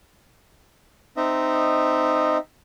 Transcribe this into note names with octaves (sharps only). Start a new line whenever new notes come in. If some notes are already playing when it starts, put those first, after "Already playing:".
C4 D#4 D#5 E5